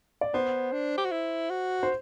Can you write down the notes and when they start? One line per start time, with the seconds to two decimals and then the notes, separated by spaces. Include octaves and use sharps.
0.21 D5
0.34 B3 C5
0.73 D4
0.98 G4
1.05 F#4
1.12 E4
1.50 F#4
1.83 C5